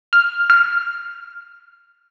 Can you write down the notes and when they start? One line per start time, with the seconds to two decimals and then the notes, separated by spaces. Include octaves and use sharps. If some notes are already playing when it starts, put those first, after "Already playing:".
0.13 F6
0.50 F6